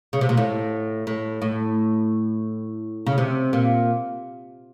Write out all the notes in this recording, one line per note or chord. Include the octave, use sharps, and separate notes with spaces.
C#3
C3
A#2
A2
A2
A2
C#3
C3
A#2